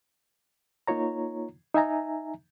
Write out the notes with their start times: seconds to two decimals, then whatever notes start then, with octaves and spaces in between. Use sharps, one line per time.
0.87 A#3 D#4 F4 C#5 A#5
1.74 D#4 E5 G#5 A#5